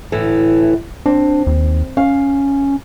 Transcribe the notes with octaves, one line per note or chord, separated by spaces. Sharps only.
D2 A2 E3
C4 D4
D#2
C#4 F5